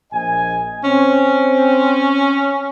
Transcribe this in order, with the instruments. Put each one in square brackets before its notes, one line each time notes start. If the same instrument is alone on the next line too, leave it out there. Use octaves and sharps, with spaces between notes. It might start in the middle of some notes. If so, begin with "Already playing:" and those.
[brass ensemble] A#1 D#5 G#5
[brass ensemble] C4 [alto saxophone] C#4